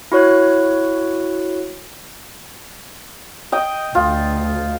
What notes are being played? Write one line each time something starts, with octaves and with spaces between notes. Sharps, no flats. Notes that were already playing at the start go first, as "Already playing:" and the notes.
E4 F#4 C#5 F#6
D#5 G5
D2 F4